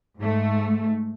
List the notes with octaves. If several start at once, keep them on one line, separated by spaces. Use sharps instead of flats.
G#2 A3